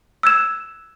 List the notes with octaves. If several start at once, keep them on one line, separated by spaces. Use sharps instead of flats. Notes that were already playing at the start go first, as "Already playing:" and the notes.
E6 F#6 G#6 E7